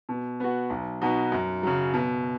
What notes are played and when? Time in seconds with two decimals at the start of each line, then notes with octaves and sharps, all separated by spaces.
0.09 B2
0.40 B3 F#4
0.70 B1
1.01 B2 B3 D#4 F#4
1.32 F#2
1.63 C#3 F#3
1.94 B2